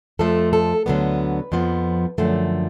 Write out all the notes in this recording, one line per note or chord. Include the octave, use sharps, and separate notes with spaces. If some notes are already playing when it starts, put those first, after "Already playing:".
F2 F3 A3 A4
A4
D2 D3 F#3 B3 B4
F2 F3 B3
F#2 D3 F3 A3